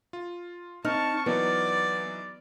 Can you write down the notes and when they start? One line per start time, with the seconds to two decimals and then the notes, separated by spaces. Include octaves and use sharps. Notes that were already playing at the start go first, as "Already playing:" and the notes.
0.13 F4
0.85 C4 D#4 A5 C#6 F6
1.26 E3 F#3 B3 D#4 D5